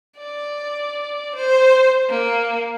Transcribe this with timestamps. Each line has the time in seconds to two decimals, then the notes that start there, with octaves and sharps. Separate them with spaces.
0.17 D5
1.35 C5
2.10 A#3